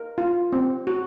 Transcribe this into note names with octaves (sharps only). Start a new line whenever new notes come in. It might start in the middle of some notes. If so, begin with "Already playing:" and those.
Already playing: A#4
F4
C4
F#4